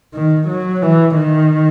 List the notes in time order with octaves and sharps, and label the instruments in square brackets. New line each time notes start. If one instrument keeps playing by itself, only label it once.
[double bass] D#3
F#3
E3
D#3